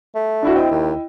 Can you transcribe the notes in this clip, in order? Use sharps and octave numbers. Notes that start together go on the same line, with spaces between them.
A3
D4 E4 F#4
C4 E4 D#5 G5
D#2